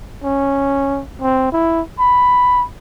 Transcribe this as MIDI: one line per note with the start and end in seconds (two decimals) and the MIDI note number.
0.24 1.02 61
1.21 1.50 60
1.52 1.81 64
1.99 2.64 83